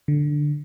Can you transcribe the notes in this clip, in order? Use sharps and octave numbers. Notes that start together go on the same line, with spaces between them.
D3